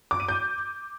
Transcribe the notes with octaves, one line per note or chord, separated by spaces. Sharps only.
D6
D#7
G6